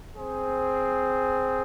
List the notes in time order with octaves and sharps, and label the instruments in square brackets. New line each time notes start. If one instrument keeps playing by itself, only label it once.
[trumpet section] C4 G#4 C5